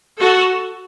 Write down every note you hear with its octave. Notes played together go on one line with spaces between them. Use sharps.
F#4 A4